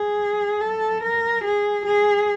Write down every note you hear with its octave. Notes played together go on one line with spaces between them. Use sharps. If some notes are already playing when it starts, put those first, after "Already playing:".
Already playing: G#4
A4
A#4
G#4
G#4